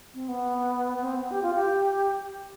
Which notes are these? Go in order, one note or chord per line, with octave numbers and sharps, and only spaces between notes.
C4
B3
C4
B3
G4
F4
G4